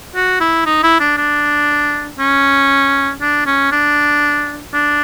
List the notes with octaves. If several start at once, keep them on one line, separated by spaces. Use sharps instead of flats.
F#4
E4
D#4
E4
D4
D4
C#4
D4
C#4
D4
D4